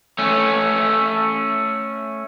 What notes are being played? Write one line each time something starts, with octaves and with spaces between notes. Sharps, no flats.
A3 C#4